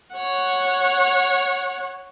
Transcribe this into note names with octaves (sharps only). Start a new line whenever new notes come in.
C#5 F#5